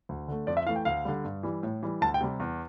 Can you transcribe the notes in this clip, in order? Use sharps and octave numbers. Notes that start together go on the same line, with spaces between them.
D2
D3 A3
F2 D5
E5
E3 A3 F5
G5
D2 F5
D3 G3
G2
E3 G3
A2
E3 G3
D2 A5
G5
C3 G3
E2